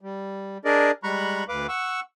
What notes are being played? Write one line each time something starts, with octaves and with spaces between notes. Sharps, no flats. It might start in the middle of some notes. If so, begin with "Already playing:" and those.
G3
D4 G#4 A#4 D5 D#5
G3 G#3 A#5 B5 C#6 F#6
D2 B4 F5 D6
F#5 C#6 E6